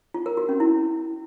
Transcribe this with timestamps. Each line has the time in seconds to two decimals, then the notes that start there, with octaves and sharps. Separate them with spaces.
0.14 F4
0.26 A#4
0.37 F#4
0.49 C#4
0.60 E4